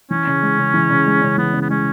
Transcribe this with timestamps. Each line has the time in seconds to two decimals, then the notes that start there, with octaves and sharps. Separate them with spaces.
0.10 E3 C#4
0.27 C#3
0.42 G#3
0.58 C#3
0.74 E3
0.90 C#3
1.06 G#3
1.22 C#3
1.38 E3 B3
1.54 C#3
1.61 B3
1.70 G#3 C#4